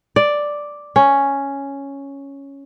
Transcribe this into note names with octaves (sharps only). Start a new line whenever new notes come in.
D5
C#4